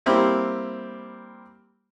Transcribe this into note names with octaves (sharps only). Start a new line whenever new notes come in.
G3 A#3 C4 E4 G4